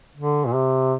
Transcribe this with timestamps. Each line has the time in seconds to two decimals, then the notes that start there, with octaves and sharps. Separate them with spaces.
0.17 D3
0.46 A#2
0.54 C3